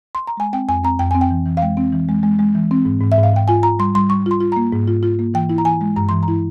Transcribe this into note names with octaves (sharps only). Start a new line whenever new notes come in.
C6
A#5
G#3 G#5
C4 G5
F2 G#5
C4 A#5
F2 G5
C4 G#5
G5
E3
E3
F5
G#3 G5
C4
E3
G#3
G#3
G#3
E3
C4
G#2
G#2
E5
G#2
F5
G#2 G5
F4 G#5
F4 A#5
G3 C6
G3 C6
G3 C#6
F4 C6
F4
A#3 A#5
G#2
F4
F4
A#3
E3 G5
E4
A#5
E3 G#5
G#3
G2 A#5
E3 C6
A#5
E4